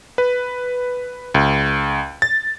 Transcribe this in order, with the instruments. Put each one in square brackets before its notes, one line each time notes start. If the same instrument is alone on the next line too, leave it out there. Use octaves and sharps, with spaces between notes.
[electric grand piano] B4
C#2
A6